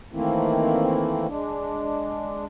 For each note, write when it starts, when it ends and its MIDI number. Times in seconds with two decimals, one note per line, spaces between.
0.13 1.27 51
0.13 1.27 52
0.13 1.27 57
0.13 1.27 58
0.13 1.27 60
0.13 1.27 64
1.27 2.45 56
1.27 2.45 62